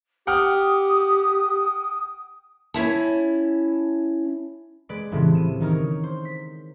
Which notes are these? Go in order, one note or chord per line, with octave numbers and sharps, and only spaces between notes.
G4 F#5 G5 D#6 F6
C#4 E4 A5
G#3 B4 D5 D7
C2 A2 C#3 E3 F3
D#7 E7
D#3 D#4 A#4 C#5
C5
B6